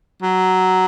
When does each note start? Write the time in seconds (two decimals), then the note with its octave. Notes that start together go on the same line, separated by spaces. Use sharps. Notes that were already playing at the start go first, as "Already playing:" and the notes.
0.21 F#3